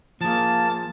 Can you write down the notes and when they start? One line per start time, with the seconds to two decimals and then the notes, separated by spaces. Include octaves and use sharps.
0.21 F3 A#3 G#4 A5